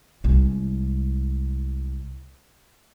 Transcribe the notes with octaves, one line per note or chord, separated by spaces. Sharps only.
C2 G#3